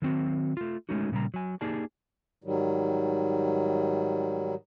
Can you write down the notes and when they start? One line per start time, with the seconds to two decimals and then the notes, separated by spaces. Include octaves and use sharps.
0.02 D#3 F#3 C4 F#4
0.57 A3 F4
0.89 G#3 A3 C#4 D#4 F#4
1.12 A#2 C#3 G3 A#5
1.34 F#3 G#5
1.61 A#3 D#4 G4 G#4 D5 A5
2.44 G#2 D#3 F#3 G3